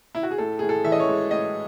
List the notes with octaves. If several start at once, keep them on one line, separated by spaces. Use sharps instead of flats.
E4
F#4
G#4
A2 A4
A2 G#4
A4
E3 E5
D#5
C#5
G#3
A2 D#5